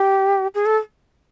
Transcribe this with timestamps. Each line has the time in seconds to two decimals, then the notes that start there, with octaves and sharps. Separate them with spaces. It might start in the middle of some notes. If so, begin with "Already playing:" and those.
Already playing: G4
0.54 G#4
0.66 A4